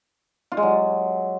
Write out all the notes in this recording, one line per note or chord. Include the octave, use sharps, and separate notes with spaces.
F4
G#3
F#3